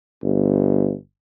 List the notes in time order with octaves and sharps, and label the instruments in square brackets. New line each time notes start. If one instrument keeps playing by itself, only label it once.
[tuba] G1